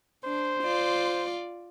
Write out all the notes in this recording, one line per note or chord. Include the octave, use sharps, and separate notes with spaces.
D4 C5
F4 D5